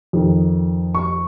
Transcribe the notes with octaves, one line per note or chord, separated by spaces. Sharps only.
F2 D#3
C#6